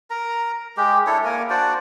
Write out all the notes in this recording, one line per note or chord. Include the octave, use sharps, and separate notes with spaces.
A#4 A#5
G#3 G4
D4 E4 A4 C#5
A#3 A#4 G#5
D4 F#4 C5 D5